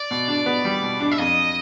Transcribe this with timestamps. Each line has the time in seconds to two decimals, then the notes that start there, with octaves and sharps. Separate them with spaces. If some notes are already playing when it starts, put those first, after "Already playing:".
Already playing: D5
0.11 B2
0.28 D4
0.46 B3
0.65 G3
0.83 B2
1.00 D4
1.12 E5
1.18 F2 D#5